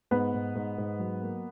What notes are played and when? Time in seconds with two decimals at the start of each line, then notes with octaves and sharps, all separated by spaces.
0.11 G#2 B3 B4
0.33 G#2
0.55 G#2
0.78 G#2
0.99 F#3
1.22 A#3